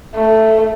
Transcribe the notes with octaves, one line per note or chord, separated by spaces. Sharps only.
A3